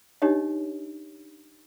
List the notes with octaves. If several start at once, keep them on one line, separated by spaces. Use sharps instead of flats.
D4 D#4 G4 C#5 D#5